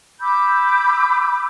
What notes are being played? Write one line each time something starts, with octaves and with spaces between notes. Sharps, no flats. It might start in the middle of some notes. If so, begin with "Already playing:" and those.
B5 D6 E6 G6